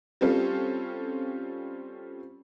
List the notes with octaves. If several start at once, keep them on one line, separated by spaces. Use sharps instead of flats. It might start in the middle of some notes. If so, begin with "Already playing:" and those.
G3 C4 C#4 F4 A4